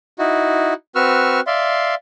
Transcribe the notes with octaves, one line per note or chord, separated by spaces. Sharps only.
D#4 E4 F#4
C4 F#4 B4 C#6 E6 F6
D5 E5 F5 C6